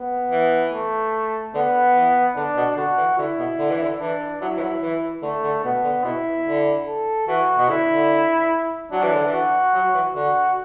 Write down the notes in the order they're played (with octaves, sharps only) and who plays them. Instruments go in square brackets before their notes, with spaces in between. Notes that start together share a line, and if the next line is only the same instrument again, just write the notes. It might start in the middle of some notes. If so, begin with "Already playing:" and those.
Already playing: [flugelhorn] B3
[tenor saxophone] E3
[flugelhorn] A3
[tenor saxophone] D3 [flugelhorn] B3
[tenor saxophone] E3
[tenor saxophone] D3 [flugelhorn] D4
[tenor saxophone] B2
[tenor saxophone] D3 [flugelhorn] F#4
[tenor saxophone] E3
[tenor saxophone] D3 [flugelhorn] E4
[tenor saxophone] B2
D3
E3
D3
[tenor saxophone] E3 [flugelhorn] D4
[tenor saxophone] F#3 [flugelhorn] E4
[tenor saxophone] E3
F#3
E3
[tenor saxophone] D3 [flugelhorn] A3
[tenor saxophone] D3
[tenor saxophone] B2 [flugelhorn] B3
[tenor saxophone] D3
[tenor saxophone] B2 [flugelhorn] E4
[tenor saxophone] D3
[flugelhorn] A4
[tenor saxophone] E3 [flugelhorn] F#4
[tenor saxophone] B2
[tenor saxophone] D3 [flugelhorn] E4
[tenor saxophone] D3
[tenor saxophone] F#3 [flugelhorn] D4
[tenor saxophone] E3
D3
E3
[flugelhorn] F#4
[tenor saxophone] F#3
E3
[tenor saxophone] D3 [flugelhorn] F#4